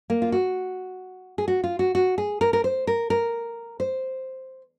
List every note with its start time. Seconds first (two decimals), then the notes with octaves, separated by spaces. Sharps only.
0.10 A#3
0.22 F4
0.32 F#4
1.38 G#4
1.48 F#4
1.64 F4
1.79 F#4
1.95 F#4
2.18 G#4
2.41 A#4
2.53 A#4
2.64 C5
2.87 A#4
3.10 A#4
3.80 C5